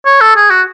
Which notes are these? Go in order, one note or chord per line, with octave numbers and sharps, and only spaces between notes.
C#5
A4
G#4
F#4